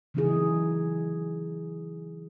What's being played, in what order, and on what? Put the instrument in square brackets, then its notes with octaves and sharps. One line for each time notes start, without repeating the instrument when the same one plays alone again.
[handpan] C#3 E3 F#3 D#4 E4 G#4